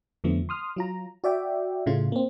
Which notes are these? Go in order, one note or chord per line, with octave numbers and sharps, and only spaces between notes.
F2 D3 F3 A3 B3
C6 D#6 F6
F#3 F4 A#5
F#4 D5 E5 G5
A2 C#3 A3 F4
A#3 C4